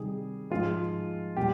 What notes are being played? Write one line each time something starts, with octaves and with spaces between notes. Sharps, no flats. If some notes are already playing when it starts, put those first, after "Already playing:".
Already playing: C3 D#3 G3 G#4
G#2 F3 G#3 F4
A#2 G3 G4